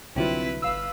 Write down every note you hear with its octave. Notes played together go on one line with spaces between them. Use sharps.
C2 D3 F#3 C4 E4 F4 B4
G1 B4 F5 E6